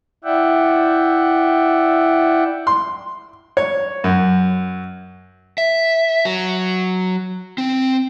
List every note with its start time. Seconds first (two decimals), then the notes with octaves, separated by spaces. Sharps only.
0.24 E4 D5 E5 F#5 G5
2.67 C6
3.57 C#5
4.04 F#2
5.58 E5
6.25 F#3
7.58 C4